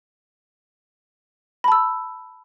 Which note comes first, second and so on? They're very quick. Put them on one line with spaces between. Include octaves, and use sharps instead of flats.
B5 A5 E6